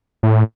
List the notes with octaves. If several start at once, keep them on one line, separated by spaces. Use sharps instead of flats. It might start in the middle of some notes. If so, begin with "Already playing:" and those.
A2